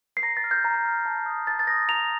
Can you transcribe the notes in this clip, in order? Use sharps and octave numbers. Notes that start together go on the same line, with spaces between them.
C7
A#5 A#6
A6
F6
G6
A#5
G6
F6
A5
D#6 G6
A5 A6
A6
D#6 G6 A#6
A#5 F7